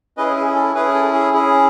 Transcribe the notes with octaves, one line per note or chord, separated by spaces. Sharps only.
C#4 E4 G#4 B4 D#5
G#4
A4
C#4 E4 G#4 B4
A4
G#4
C#4 E4 G#4